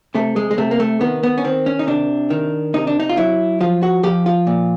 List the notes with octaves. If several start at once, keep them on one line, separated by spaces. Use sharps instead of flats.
C3 A3
G#3
G#3
C3 A3
A#3
A3
D#3 B3
B3
C#4
D#3 C4
C#4
D#4
C3 D4
D#3
C3 D#4
D4
D#4
F4
F#3 E4
F3 F4
F#4
F3 G4
F4
A#2